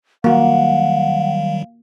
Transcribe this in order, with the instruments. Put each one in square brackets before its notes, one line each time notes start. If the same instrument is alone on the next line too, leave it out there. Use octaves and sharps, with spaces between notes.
[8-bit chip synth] D#3 F#3 G3 [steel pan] A#3 F#4 [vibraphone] F5 [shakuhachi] F#5